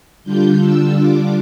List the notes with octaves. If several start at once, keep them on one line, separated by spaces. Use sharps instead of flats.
D3 G3 D4 F4 G6
E6
D6